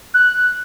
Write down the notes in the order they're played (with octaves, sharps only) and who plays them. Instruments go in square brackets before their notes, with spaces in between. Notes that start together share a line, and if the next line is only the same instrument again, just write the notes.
[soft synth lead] F#6